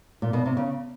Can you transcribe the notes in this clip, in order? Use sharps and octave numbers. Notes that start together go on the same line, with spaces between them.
A#2
B2
C3
C#3